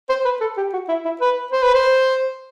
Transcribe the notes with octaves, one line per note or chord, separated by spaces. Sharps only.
C5
B4
A4
G4
F#4
E4
E4
B4
C5
B4
C5